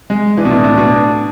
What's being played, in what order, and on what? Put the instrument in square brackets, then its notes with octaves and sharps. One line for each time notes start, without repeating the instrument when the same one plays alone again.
[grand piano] G#3
[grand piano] E3 [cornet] D4
[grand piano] B2
A2
A2
B2